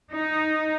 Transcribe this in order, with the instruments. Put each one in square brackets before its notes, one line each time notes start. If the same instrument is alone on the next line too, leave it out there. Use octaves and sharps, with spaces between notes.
[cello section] D#4